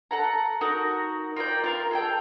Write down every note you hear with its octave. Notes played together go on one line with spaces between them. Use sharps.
A4 F#5 A#5
D#4 F#4 A#4
F4 A#4 D5 G5
F4 A#4 C6
G#4 A4 G5